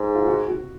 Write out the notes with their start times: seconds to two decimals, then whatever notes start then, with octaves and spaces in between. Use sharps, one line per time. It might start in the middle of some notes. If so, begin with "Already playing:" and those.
Already playing: G#2
0.15 F4
0.27 F#4
0.48 F#4